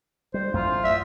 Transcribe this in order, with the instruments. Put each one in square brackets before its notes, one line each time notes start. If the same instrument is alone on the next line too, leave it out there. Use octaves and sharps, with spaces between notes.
[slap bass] G3 [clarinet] C5
[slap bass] A1 F#2 A3 [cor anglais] F4
[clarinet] E5